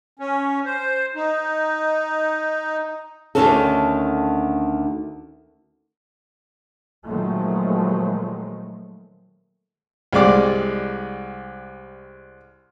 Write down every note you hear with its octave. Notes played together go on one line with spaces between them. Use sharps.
C#4
C5
D#4
D2 A2 D3 D#3 C#4 A4
A#2 D#3 F3 F#3 G#3 A3
C2 G3 G#3 D5 D6